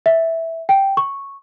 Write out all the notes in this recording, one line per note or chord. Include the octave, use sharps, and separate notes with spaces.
E5
G5
C#6